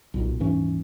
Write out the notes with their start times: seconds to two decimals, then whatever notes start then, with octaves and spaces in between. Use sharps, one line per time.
0.14 B1 A#2
0.40 D#1 G#2 E3 C#4